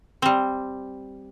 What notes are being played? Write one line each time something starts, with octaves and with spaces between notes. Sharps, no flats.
G3 C4